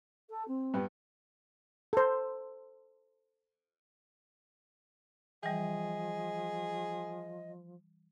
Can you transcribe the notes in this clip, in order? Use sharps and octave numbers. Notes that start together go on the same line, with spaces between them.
A4
C4
G2 B3 G4
A4 C5
E3 F3 G3 G#4 D#5